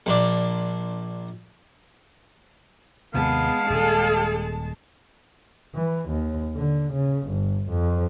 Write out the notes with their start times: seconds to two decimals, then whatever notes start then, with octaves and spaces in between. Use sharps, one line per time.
0.06 A#1 A#2 D4
3.14 D#2 C3 D#3 G#3 B3 F5 A5
3.70 D#1 G#4 A4
5.75 E3
6.09 D#2
6.56 D3
6.93 C#3
7.27 G1
7.69 F2